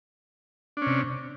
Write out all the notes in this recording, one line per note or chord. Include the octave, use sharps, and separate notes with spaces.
C3 C#4 D4